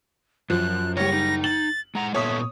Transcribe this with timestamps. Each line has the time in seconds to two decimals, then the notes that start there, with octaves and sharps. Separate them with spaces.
0.50 F#2 F3 F#6
0.97 F#1 G3 C#5 A#6
1.13 D#4
1.44 A6 F#7
1.95 G#3 F#5 A#5
2.14 A#2 B3 A4 C#5 E5 D#6